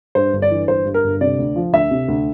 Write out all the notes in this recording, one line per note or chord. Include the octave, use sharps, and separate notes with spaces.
G2 C5
G1
D5
E3
G1 C5
G2
A#4
G1
C3 D5
D2
F3
D2 E5
C3
D2